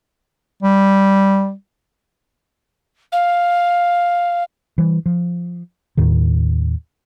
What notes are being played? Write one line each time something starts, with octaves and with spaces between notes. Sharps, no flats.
G3
F5
E3 G3
F3
D#2 A2 D#3